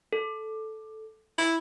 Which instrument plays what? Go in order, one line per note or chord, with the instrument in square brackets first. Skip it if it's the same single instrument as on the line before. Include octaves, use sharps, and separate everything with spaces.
[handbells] A4
[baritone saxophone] E4